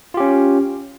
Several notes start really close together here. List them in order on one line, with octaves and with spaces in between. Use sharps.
F4 G4 C#4